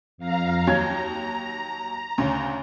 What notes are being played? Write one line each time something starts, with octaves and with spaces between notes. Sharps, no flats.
F2 F5 A#5
D#2 F#3 A#5 G#6
D2 C#3